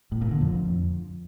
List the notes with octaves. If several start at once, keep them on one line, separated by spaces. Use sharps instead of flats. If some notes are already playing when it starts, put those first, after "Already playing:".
A2
A#2
D3
F2